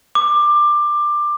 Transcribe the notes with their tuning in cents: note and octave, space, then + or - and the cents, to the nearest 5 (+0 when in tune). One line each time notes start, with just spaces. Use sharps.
D6 +20